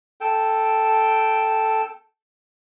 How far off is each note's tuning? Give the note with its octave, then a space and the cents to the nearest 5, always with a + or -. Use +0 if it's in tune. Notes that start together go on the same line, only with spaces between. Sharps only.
A4 +0 G5 +0